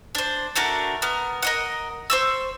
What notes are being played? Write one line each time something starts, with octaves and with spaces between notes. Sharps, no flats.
D4 C5
A3 D4 F#4 A#4
B3 A#4
A#4 D#5 F#5
C5 C#6 E6